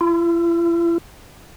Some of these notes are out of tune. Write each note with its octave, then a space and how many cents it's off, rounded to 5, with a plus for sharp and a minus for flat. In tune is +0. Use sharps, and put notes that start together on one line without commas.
E4 +45